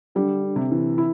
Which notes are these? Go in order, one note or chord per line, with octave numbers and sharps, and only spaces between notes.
D3 G3
D3
C3
E3
E4